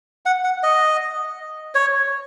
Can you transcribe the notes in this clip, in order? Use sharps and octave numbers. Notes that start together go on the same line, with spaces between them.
F#5
F#5
D#5
C#5